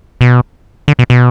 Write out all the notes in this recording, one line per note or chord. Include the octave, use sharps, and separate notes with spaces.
B2
D3
B2
B2